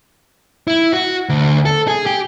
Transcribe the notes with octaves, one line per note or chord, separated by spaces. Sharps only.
E4
F#4
D2
A4
G#4
G4